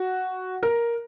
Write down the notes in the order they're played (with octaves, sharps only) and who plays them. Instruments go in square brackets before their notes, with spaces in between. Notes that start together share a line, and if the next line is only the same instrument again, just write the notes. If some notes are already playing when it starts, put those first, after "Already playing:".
Already playing: [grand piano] F#4
A#4